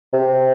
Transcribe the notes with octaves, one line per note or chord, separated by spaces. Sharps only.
C3